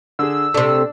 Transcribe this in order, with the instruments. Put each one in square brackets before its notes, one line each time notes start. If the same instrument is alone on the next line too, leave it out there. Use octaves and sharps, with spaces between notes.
[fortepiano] D3 G#4 [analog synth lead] E6
[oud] C3 A3 [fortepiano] D4 D5